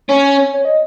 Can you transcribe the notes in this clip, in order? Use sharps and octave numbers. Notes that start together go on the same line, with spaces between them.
C#4 C#5
C#5
D#5